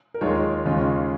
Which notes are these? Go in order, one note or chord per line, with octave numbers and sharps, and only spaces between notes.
A#4
D#2 D#3 G#3 F4 G#4 C#5
D#2 C#3 G#3 C#4 F4